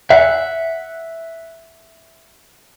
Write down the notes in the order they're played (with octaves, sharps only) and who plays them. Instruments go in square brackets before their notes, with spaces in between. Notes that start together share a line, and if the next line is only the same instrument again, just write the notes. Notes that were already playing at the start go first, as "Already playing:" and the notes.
[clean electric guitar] E5 F#5